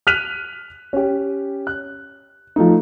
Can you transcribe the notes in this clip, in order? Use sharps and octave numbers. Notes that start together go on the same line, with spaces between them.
F6 F#6 B6 D#7 F7
C#4 G4
F#6
F3 A3 D#4